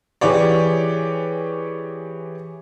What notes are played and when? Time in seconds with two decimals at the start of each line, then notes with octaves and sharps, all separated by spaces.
0.21 E3 G4 G#4 C#5 D5